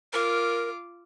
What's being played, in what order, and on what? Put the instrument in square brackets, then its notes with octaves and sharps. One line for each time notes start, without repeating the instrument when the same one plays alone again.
[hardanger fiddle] F4 D6 [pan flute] A#4